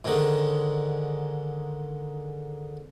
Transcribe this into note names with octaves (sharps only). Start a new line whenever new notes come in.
G#2 D3 D#3 G#3